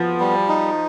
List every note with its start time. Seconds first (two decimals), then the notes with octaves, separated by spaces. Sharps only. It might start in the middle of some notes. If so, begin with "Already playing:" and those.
Already playing: F3 B3
0.20 G3
0.48 D#4